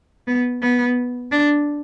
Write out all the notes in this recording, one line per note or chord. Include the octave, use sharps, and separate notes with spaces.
B3
B3
D4